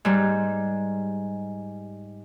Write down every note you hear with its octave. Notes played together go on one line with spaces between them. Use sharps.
G#2 G3